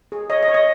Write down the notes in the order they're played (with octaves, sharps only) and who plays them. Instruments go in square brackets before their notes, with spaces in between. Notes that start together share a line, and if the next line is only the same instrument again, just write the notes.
[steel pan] G#4
C#5 D#5
D#5
C#5
D#5